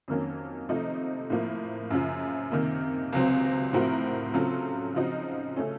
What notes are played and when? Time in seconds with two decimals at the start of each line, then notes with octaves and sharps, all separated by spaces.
0.08 F2 D#3 F#3 A#3 C#4
0.69 C3 F3 A3 D#4
1.30 A2 F3 A#3
1.90 F#2 C#3 F3
2.52 C3 D#3 A#3
3.12 C#2 C3 F#3 C4
3.73 A2 F3 C4 F#4 A#4
4.34 C#3 F#3 C4 F4 A4
4.94 C#3 F3 C4 D#4 F#4
5.56 C#3 A3 C#4 A4